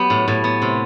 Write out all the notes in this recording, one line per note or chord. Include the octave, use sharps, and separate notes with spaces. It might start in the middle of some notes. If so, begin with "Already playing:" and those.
Already playing: F#3 B3 G4
A2
A2
B3
C3